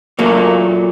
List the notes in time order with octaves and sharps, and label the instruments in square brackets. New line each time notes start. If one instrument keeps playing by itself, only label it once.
[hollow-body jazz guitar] A#2 F#3 A3 A#3